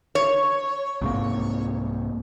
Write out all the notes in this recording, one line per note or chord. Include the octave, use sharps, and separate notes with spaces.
C#5
C2 G#2 A#3